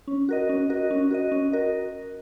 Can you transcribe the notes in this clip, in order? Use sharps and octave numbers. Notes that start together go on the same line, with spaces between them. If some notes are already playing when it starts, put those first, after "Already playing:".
C#4
F#4 A#4 D#5
C#4
F#4 A#4 D#5
C#4
F#4 A#4 D#5
C#4
F#4 A#4 D#5